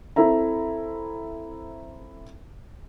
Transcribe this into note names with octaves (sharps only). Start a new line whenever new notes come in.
C4 E4 A4 E5 A#5